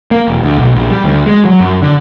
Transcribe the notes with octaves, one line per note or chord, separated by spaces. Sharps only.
A#3
E1
D2
B1
A#1
G3
D2
G#3
F#3
F#2
D3